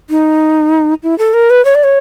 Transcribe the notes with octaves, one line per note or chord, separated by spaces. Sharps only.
D#4
E4
A4
A#4
B4
C#5
D5
C#5